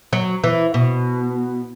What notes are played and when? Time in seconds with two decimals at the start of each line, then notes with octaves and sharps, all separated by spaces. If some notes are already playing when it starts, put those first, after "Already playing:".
0.13 F#3
0.44 E3
0.74 B2